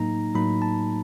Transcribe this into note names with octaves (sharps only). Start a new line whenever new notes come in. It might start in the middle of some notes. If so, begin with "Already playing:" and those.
Already playing: A2 F#3 A#3 D#4 A#5
A2 F#3 A#3 D#4 B5
A5